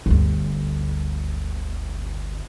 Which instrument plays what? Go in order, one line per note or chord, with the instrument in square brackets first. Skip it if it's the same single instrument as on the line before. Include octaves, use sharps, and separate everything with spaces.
[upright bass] G1 D2